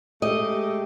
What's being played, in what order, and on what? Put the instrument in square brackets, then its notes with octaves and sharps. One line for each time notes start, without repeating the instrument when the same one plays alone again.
[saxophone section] G#3 A3 G4 [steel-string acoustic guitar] D#5